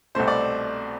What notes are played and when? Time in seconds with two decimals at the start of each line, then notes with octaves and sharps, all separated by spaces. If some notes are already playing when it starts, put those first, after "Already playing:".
0.15 C2 B2 A3 C4 C5
0.28 D5